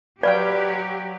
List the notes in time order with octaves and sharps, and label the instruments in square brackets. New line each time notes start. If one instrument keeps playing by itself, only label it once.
[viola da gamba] F#3 [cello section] G4 [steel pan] B4 F5 G5 [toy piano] D5